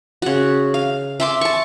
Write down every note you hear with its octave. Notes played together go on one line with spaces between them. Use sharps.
C#3 F#4
F5
E5 C6 D6
A5 C#6